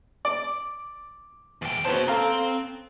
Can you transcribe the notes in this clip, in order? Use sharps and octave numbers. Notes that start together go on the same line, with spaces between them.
D5 D6
E2 G5
B3 C#4 F#4 C5 A5
C4 A4 F5 A#5